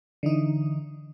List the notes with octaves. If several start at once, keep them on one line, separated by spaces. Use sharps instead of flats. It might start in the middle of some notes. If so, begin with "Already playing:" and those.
D3 E3 D#4